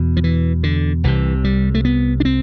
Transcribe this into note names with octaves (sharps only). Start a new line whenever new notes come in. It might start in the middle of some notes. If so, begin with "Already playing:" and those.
Already playing: E2 B2
F3
E3
D3
C2 C3 E3
G3
A3
B3
D4
C4